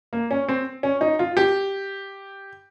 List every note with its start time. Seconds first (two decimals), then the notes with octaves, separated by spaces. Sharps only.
0.13 A#3
0.31 C#4
0.49 C4
0.83 C#4
1.01 D#4
1.19 F4
1.37 G4